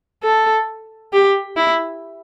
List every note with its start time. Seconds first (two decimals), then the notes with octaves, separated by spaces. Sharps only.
0.23 A4
1.13 G4
1.57 E4